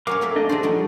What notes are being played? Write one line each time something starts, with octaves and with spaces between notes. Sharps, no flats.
F#3 C#4 A#4 C#5 F5 D6
A3 A#3 E5
D4 D#5
F#3 A3 D4 G#4 C5
F3 G3 D4 D#4 F#4